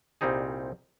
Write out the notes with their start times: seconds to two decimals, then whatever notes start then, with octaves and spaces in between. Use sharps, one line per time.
0.21 C2 A#2 G3 C4 D#4 G#4